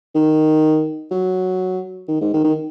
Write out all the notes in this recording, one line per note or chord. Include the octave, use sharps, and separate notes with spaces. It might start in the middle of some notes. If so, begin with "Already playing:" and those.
D#3
F#3
D#3
G#2
D#3
D#3